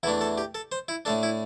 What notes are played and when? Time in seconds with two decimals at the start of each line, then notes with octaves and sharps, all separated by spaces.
0.03 E2 E3 A3 D4 E4
0.21 A4
0.38 G4
0.55 A4
0.72 C5
0.88 E4
1.05 A2 A3 D4 A4
1.23 E4